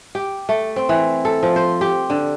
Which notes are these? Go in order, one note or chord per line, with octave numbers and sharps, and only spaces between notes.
G4
A3
C4
E3
A4
F3
C5
G4
D3